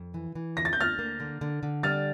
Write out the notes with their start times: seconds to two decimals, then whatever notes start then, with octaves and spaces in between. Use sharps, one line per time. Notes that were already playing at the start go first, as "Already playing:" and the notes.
Already playing: F2
0.14 E3
0.35 E3
0.56 D3 A#6
0.65 A6
0.73 G6
0.78 D2 F6 A6
0.99 A#3
1.20 D3
1.41 D3
1.63 D3
1.83 G3 F6 A6